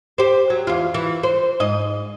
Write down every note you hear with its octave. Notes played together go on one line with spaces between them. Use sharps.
G4 C5
F#3
E2 F4
E3
C5
G#2 D#5